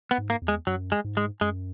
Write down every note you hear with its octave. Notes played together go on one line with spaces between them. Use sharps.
B3
G#2
A#3
E2
G#3
F#2 F#3
G#3
G#2
G#3
F#2 G#3